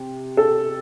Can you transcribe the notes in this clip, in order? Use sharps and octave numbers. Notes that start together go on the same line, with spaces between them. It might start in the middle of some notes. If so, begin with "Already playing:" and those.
Already playing: C3
A4